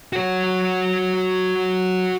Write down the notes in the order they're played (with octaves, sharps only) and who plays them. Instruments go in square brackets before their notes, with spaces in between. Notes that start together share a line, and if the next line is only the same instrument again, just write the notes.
[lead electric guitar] F#4 C#5